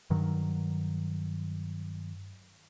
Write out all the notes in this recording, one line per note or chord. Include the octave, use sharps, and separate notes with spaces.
G2 D#3 F#3